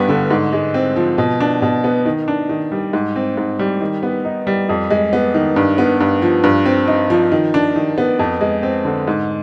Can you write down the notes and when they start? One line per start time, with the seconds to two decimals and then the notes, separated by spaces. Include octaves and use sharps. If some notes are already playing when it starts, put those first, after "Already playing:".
Already playing: G2 G3 B3
0.09 D3
0.31 G#2
0.53 G#3
0.74 C4
0.96 F3
1.18 B2
1.40 D4
1.62 B2
1.84 B3
2.06 D#3
2.28 D4
2.49 D#3
2.72 G3
2.93 G#2
3.16 C4
3.37 G#2
3.59 G3
3.81 D#3
4.03 B3
4.25 D#4
4.47 G3
4.69 F2
4.91 G#3
5.13 B3
5.34 D#3
5.56 G2
5.78 B3
6.00 G2
6.22 F3
6.44 G2
6.66 C4
6.88 D#4
7.10 F3
7.32 D#3
7.54 D4
7.76 D#3
7.98 B3
8.19 F2
8.41 G#3
8.63 C4
8.85 D3
9.08 G#2